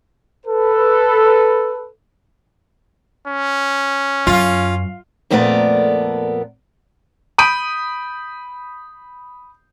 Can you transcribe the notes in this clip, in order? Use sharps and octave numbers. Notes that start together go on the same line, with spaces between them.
A4 B4
C#4
F#2 F4
F2 A#2 A3 B3 A#4 D5
B5 D#6 G6 D7 D#7